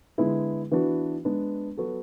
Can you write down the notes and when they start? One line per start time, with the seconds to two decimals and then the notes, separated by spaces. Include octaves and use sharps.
0.18 D3 G#3 B3 E4 G#4
0.71 E3 B3 D4 F#4
1.25 G#3 B3 D4
1.77 F#3 B3 F#4 A4